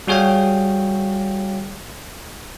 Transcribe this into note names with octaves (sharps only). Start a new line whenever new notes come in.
G3 F#4 G#4 C#5 F5 G5